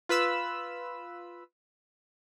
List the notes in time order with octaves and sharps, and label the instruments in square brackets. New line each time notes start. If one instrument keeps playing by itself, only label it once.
[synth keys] F4 B4 B5 E6